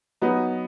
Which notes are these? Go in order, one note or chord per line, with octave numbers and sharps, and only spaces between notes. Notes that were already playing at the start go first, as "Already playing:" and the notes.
F#3 B3 D#4